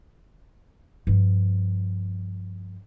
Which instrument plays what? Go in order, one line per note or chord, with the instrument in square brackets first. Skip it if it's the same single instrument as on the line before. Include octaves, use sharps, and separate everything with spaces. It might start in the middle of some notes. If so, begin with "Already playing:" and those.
[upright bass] G2 F3